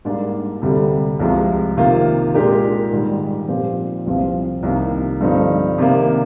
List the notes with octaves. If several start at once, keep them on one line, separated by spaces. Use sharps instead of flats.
G#2 G3 A#3 D4
D2 C3 G3
C2 C3 F3 G#3
C3 D#3 A#3 F4
A#2 G#3 D4 G4 A#4
G#2 D#3 G3
A#2 F3 C4 G4
C2 C3 F3 C4 F4
C2 C3 D#3 A#3 D#4
G2 D3 F3 C4 D#4
C3 D#3 A#3